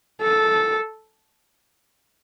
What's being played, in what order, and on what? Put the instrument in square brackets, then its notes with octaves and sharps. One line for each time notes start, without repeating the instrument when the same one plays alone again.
[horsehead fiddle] A4